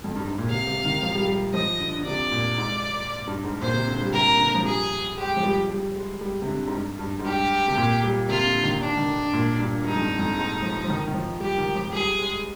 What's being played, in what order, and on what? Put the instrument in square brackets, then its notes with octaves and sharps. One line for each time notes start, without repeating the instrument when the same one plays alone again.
[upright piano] F2
G2
G#2
A#2
[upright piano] C3 [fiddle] F5
[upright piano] C3
D#3
F3
G3
G3
[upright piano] F3 [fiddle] D#5
[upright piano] D3
D3
[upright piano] C3 [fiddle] D5
[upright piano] A#2
G#2
G2
G#2
[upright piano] A#2 [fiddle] C5
[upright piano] C3
D3
G3
[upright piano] C3 [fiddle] A#4
[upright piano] D3
F3
[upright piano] G3 [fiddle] G#4
[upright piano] G#3 [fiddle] G4
[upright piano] F3
G3
G3
G#3
G3
C3
D3
G#2
G2
G2
G#2
[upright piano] G2 [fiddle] G4
[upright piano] C3
A#2
G3
[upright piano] C3 [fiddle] F4
[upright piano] D3
D#3
[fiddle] D4
[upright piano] D#3
D3
A#2
G2
[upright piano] G2 [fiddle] D#4
[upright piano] F2
G2
F2
G#2
F3
F3
D#3
D#3
F3
[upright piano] G3 [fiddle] G4
[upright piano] D#3
F3
[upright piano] G3 [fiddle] G#4
[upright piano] G#3